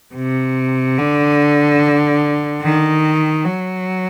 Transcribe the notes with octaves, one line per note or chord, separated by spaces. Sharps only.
C3
D3
D#3
F#3